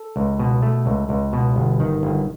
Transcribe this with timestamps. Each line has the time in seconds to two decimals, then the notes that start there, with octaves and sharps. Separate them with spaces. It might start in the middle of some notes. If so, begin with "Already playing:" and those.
Already playing: A4
0.16 C#2
0.39 B2
0.62 A3
0.86 C#2
1.09 C#2
1.33 B2
1.56 G1
1.80 D#3
2.03 G1